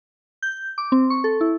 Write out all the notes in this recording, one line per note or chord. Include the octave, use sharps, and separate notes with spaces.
G6
D6
C4
C#6
A4
E4